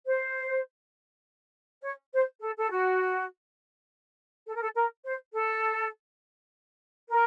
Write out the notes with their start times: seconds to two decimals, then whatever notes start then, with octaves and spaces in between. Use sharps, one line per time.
0.06 C5
1.81 C#5
2.11 C5
2.41 A4
2.57 A4
2.70 F#4
4.46 A4
4.54 A#4
4.62 A4
4.75 A#4
5.04 C5
5.33 A4
7.10 A#4